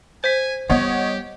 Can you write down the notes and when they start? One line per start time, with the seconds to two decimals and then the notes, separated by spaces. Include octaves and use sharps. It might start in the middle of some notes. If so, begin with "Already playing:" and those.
0.24 C5 G#5 B6
0.70 G3 B3 G4 C#5 D#5 F#5